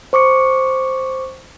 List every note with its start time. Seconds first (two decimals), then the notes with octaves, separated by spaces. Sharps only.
0.13 C5 C#6 D6 C#7